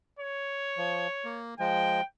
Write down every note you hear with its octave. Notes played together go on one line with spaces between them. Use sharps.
C#5
F3
A#3
F3 G#3 G5